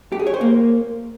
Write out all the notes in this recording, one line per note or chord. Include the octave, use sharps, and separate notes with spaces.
G4
G#4
C#5
C5
A#3